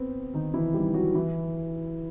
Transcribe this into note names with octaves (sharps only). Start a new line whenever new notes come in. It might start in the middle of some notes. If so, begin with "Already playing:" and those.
Already playing: B3 C4
D#3 D#4
E3 E4
G3 G4
F#3 F#4
E3 E4